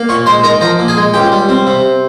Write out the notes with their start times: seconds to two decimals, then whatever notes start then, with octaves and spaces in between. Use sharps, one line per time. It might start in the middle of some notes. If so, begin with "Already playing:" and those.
Already playing: A#3
0.09 A#2 C#5 C#6
0.26 G#3 C5 C6
0.43 D#4 A#4 A#5
0.61 F3 A#4 A#5
0.79 A#2
0.88 G#4 G#5
0.97 G#3
1.14 C#2 G4 G5
1.32 G3
1.49 C4
1.67 C3